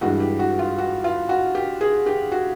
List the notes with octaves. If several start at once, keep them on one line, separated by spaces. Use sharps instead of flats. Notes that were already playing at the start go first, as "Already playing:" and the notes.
G2 E3 G#3 F#4
G4
F#4
F4
F#4
F4
F#4
G4
G#4
G4
F#4